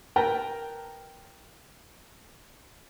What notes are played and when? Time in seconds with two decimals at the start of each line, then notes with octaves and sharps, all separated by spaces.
0.16 A#4 B4 G5 A5 A#5